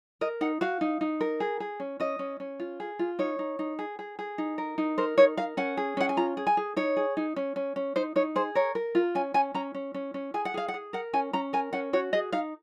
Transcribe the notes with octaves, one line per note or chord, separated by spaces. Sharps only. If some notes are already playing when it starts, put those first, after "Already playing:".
A#4 D#5
D#4 F#5
F#4 F5
D#4
D#4
A#4
G#4
G#4
C#4
C#4 D#5
C#4
C#4
F4
G#4
F4
D#4 C#5
D#4
D#4
G#4
G#4
G#4
D#4
A#4
D#4
A#4 C5
D#4 C#5
A#4 F5
C#4 F#5
G#4
C#4 F#5
G#5
F4 A#5
G#4
G#5
G#4
D#4 C#5
G#4
D#4
C#4
C#4
C#4
D#4 C5
D#4 C#5
G#4 C5
A#4 C#5
A#4
F4
C#4 G#5
C#4 G#5
C#4 A#5
C#4
C#4
C#4
G#4 G#5
F#5
G#4 F5
F#5
G#4
A#4 F#5
C#4 G#5
C#4 A#5
A#4 G#5
C#4 F#5
F#4 C#5
G#4 D#5
D#4 F5